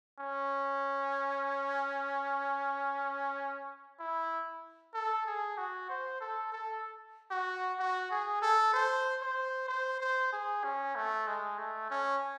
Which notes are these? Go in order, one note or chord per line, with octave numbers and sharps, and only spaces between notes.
C#4
E4
A4
G#4
F#4
C5
A4
A4
F#4
F#4
G#4
A4
C5
C5
C5
C5
G#4
C#4
A3
G#3
A3
C#4